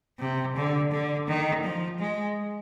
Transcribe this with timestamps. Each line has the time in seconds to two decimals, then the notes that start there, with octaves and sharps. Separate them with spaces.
0.19 C3
0.56 D3
0.91 D3
1.27 D#3
1.63 F3
1.99 G#3